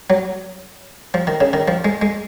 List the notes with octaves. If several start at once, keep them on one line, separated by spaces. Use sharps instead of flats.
F#3
F3
D#3
C#3
D#3
F3
G#3
G#3